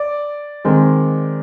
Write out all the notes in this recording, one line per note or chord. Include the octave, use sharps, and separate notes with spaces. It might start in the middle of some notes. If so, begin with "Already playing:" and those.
Already playing: D5
D#3 G#3 C4